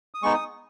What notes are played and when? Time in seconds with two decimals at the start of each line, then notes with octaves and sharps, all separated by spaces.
0.14 D#6
0.23 G#3 B3 D#4 C#6
0.34 D#6